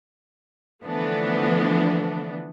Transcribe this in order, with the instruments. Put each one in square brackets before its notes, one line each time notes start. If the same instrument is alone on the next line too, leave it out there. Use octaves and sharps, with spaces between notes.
[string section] D3 E3 F3 A3 B3 D4